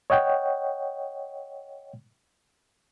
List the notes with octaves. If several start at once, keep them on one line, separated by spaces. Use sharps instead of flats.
C#5 D#5 F#5 G5